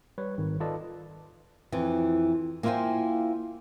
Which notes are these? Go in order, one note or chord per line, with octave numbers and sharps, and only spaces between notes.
G3 B4 C#5
G#1 D#3
F4 A4 B4 D5 D#5 A5
F2 E3
A#3 E4 F4 C5 G5 G#5